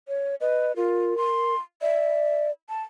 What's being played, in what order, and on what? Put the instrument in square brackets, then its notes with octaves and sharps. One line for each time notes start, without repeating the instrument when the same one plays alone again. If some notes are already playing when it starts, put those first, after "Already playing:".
[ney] C#5
[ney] B4 [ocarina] D#5
[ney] F4 [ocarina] A#4
[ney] C6
[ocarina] D5 [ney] E5
[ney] A5